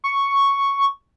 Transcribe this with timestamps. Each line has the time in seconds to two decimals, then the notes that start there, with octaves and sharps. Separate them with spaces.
0.04 C#6